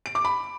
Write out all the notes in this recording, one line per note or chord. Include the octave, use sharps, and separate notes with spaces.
D7
D6
B5